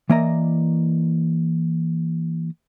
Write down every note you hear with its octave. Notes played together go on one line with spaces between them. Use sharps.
E3 A#3 D5 D#5 A#5